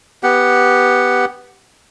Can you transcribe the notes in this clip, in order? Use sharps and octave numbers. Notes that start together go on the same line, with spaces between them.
B3 G4 F#5